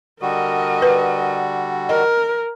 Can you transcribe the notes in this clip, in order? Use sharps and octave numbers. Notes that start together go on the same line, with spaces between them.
D3 G3 F#4 A#4 D#5
B4
A#4 D#5